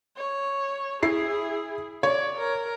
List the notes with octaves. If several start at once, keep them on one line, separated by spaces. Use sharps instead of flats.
C#5
E4 G#4 C7
C#5 D5
A#4